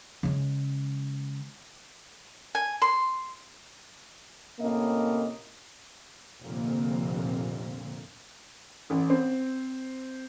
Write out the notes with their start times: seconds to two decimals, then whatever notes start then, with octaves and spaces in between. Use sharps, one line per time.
0.23 C#3 G#3
2.55 G#5
2.82 C6
4.60 A2 C3 A#3 C#4 D#5
6.43 F1 A#1 A#2 D3 A#3 C4
8.90 A1
9.10 C4